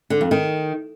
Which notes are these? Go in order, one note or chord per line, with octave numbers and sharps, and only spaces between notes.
D3
F2
D#3